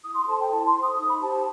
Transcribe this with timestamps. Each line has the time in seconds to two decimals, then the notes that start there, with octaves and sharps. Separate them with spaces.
0.03 E4 D#6
0.15 C6
0.27 A4 C5 A5
0.39 G5
0.50 E4 A5
0.66 C6
0.74 A4 C5
0.82 D#6
0.97 D#4 D#6
1.08 B5
1.20 G4 C5 A5
1.32 A5